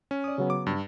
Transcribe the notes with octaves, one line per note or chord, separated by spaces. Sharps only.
C#4
D5 D#6
C#3 F#3 B3
D6
G2